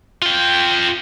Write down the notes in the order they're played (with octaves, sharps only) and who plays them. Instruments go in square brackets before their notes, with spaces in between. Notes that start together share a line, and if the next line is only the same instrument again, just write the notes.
[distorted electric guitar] F4 G5